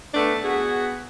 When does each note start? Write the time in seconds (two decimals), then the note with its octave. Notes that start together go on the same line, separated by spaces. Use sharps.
0.14 A3 B3 D4
0.44 B3 F#4 G#4